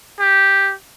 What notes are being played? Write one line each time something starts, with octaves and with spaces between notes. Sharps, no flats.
G4